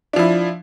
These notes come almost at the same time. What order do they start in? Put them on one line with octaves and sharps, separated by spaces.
D4 F3 E4